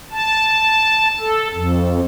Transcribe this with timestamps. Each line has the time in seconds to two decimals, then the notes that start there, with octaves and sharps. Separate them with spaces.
0.11 A5
1.20 A4
1.53 F2